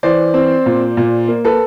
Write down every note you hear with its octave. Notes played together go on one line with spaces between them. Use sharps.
E3 C5 D5
C4
A#2
A#2
A#3
A4 B4